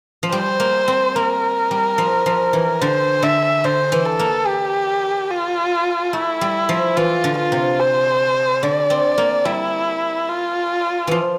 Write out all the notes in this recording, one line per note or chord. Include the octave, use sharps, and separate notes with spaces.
F3
G3 C5
A#3
C4
A#3 A#4
G3
F3
F3
E3
D3 C5
D3 E5
D3 C5
E3
A4
A#3
G4
F4
A3 E4
G3
F3
E3 F4
D3
F4
C3
C5
D3 D5
C4
A#3
G3 E4
F4
E3 F3